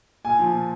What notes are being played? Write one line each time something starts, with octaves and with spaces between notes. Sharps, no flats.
A#2 G#5
F3
A#2